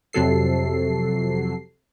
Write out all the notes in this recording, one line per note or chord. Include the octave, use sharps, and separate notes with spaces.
F2 C3 F#3 A4 C7